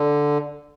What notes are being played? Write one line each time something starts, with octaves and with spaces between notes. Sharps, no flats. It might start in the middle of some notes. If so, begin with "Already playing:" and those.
Already playing: D3